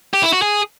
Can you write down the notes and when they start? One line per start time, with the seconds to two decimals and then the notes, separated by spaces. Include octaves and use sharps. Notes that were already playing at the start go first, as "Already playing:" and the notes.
0.14 G4
0.23 E4
0.32 F#4
0.42 G#4